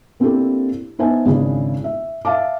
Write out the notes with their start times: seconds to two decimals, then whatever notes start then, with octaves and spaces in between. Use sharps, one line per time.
0.20 A#3 C4 D4 E4 G4 A4
0.99 B3 D#4 C5 E5 G#5 A5
1.25 G#1 C#3 D4 E4 G#4
1.84 E5
2.25 E5 F5 A5 D6